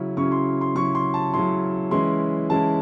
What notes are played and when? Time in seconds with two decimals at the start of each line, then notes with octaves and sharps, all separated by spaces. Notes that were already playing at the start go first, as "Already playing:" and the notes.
Already playing: C#3 F#3 C#4 E4
0.17 C#3 F#3 C#4 E4 C#6
0.32 C6
0.61 C6
0.75 C#3 F#3 C#4 E4 C#6
0.95 C6
1.14 A5
1.33 C#3 F#3 C#4 E4 C6
1.91 E3 G#3 C#4 E4 C6
2.50 E3 G#3 C#4 E4 A5